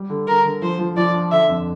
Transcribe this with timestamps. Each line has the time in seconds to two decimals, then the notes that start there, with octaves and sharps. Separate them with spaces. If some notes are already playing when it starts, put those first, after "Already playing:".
Already playing: G3
0.10 D3
0.27 D3 A#4
0.45 D3
0.62 F3 C5
0.79 F3
0.97 F3 D5
1.14 D4
1.31 D3 E5
1.49 F2